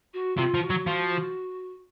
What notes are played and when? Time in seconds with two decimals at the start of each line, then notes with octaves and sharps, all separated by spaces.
0.14 F#4
0.38 C3 F4
0.54 F3
0.62 F#4
0.70 F#3
0.87 F3